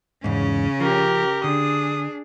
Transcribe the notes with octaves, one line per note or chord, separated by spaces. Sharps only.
E2 G#2 C#3 C#4
F3 G4 A#4
D3 D4 G#4 D#6